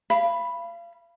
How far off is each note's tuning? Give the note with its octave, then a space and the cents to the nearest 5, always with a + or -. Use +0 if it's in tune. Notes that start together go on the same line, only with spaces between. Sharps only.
F5 -35 B5 +0